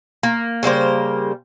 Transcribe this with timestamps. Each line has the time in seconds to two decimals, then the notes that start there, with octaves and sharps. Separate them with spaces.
0.23 A#3
0.63 C#3 G3 A#3 C5